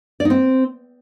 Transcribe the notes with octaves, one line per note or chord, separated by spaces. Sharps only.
D5
D#4
C4